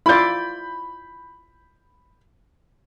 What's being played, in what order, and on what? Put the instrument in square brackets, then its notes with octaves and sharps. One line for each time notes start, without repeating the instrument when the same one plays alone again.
[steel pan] E4 F4 D5 [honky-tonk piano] B5 G6